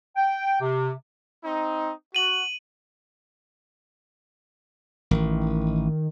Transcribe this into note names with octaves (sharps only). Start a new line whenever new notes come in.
G5
C3
C4 D#4
F#4 D#7 F#7
A1 D#3